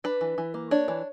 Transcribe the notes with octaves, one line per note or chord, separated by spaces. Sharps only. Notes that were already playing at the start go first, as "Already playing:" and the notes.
D4 B4
E3
E3
A#3
D4 C#5
E3